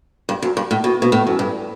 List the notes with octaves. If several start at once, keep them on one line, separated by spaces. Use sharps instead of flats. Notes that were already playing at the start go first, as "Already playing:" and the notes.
G2
F#2
G2
A2
B2
B2
A2
F#2
G2